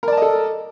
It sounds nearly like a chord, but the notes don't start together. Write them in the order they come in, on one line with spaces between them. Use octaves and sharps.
A#4 D5 A5 D#5 A4